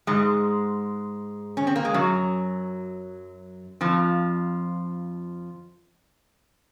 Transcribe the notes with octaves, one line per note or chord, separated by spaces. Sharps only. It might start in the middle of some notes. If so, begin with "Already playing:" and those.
G#2 G#3
C#4
C4
A#3
G#3
F#2 F#3
F2 F3